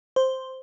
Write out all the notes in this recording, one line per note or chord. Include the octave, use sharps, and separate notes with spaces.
C5